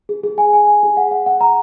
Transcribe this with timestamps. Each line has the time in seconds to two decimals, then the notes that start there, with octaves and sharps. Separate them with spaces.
0.09 G#4
0.24 G#4
0.38 G#5
0.53 G#5
0.67 G#5
0.83 G#4
0.97 F#5
1.11 F#5
1.26 F#5
1.41 A#5